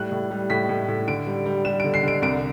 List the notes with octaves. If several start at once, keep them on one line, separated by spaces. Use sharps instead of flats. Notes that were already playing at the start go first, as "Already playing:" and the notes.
Already playing: A2 G3 F#6
A2
G3
A2 B6
A2
A2
D3 D7
G3
G3
G3 E7
D3 D7
C7
D3 D7
C2 D7